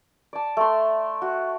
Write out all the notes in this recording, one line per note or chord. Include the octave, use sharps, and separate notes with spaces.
D5 A5
A3 C6
F#4